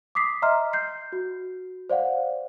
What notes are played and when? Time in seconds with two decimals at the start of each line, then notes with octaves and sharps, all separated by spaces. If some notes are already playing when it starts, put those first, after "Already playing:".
0.15 D6 D#6 B6 C7
0.42 D#5 E5 A#5 C6 F6
0.73 G6 C7
1.12 F#4
1.90 C5 D5 F5 F#5